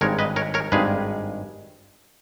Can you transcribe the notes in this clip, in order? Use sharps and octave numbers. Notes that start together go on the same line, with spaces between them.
G#1 G2 D#3 G#3 A#4 C#5
B4 D#5
A#4 C#5
A#4 C#5
G#1 G2 D#3 G#3 G#4 B4